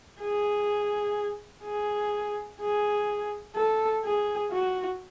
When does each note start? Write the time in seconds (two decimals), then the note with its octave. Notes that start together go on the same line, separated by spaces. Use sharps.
0.20 G#4
1.64 G#4
2.61 G#4
3.56 A4
4.05 G#4
4.52 F#4